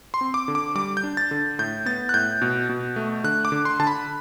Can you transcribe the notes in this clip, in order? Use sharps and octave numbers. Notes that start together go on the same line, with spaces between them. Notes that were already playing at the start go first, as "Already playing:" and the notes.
C6
C4
D6
D3
D6
G3 D6
G6
D4
A6
D3
A2 G6
B3 A6
F#6
A2 G6
B2
B2
A3
D3 F#6
D6
D3
C6
D3 A5
B5